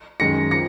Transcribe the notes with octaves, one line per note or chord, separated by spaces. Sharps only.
F#2 D#3 G#3 A#6 C#7
F3 A#6 C#7